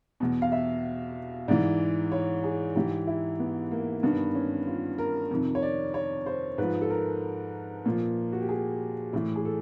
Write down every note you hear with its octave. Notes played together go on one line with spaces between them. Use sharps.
E2 B2
F5
E5
G#2 E3 D5
C#5
G#4
G#2 E3 G4
E4
B3
A#3
G2 D#3 B3
C#4
F4
A#4
F2 C3 D#3
C#5
D5
C#5
C5
G#2 F3 B4
A4
A#4
A#2 F3
F#4
G4
G#4
A2 E3
G#4
A4